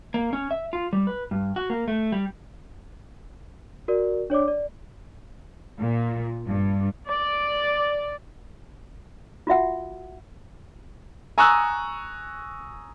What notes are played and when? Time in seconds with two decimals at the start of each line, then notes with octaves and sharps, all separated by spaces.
0.14 A#3
0.33 C#4
0.51 E5
0.73 F4
0.93 G3
1.07 B4
1.31 G2
1.56 F#4
1.70 A#3
1.88 A3
2.12 G3
3.88 F#4 A#4 D5
4.30 D4 C#5 D5 D6
4.48 D5
5.79 A#2
6.47 G2
7.08 D5
9.47 F4 F#4 E5 F#5
11.38 G#5 A#5 C#6 D#6 E6 F#6